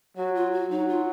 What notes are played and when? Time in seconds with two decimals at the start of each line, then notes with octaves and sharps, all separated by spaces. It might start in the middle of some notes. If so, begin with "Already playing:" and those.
0.17 F#3 F#4
0.35 F4
0.53 F#4
0.71 F#3 D#4
0.89 F4